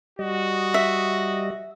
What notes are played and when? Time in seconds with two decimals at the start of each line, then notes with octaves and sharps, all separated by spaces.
0.19 G3 F#4 D#5
0.74 E5